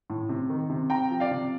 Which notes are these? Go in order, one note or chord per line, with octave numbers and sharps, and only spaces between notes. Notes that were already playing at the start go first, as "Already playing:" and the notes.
A2
C3
D#3
C3
C3 G5 A#5
F3
D5 F5
C3